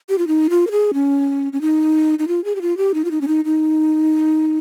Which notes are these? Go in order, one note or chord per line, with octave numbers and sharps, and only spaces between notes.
G4
F4
D#4
F4
A#4
G#4
C#4
C#4
D#4
D#4
F4
G#4
G4
F4
G4
D#4
F4
D#4
C#4
D#4
D#4